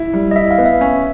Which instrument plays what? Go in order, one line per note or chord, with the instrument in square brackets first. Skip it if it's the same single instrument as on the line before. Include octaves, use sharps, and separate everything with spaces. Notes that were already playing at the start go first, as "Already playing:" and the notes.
Already playing: [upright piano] E4
G3
[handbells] D#5
[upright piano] E4 [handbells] E5
[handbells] F5
[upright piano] B3
[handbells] E5
[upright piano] C#4 [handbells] E5